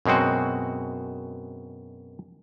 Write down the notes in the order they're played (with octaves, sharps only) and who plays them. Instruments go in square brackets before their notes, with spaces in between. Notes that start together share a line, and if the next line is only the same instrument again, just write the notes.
[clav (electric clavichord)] F#2 B2 G#3 C4 F#4